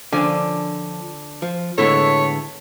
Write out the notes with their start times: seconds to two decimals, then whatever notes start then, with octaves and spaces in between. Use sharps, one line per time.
0.12 D3 F3 C#4 D4 G#5
1.42 F3
1.78 A2 D3 G#3 B3 E4 A4 C#5